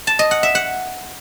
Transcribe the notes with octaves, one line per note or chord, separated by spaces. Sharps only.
A5
D#5
F#5
E5
F#5